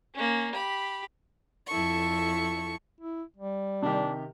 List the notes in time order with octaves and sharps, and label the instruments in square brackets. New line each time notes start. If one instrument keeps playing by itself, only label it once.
[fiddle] A#3 C#4
G4 B5
[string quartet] F2 E4 A4 C#6
[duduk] E4
G3
[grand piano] C3 D#3 G4 [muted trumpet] D4